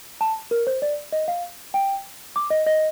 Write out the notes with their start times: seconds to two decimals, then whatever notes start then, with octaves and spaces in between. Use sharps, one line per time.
0.21 A5
0.51 A#4
0.67 C5
0.82 D5
1.12 D#5
1.28 F5
1.74 G5
2.36 D6
2.50 D#5
2.67 D#5